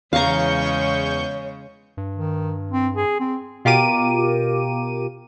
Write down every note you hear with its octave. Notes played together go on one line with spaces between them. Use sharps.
E2 C#3 G#3 C#5 F5 A#5 C#6 G6
G2
D#3
C4
G#4
C4
B2 F4 G4 A#4 D6 D#7